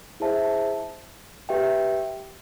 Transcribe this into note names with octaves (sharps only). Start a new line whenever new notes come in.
E4 G#4 C5 E5 A5
G4 B4 E5 G5